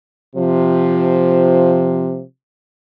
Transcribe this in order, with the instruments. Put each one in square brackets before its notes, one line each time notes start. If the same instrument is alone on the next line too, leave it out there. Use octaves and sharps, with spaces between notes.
[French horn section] C3 F3